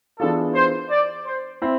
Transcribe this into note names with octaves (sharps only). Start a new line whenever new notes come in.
E3 B3 D4 F4 G#4 A4
C5
D5
C5
C4 E4